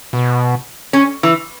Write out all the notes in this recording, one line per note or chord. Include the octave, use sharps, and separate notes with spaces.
B2
C#4
E3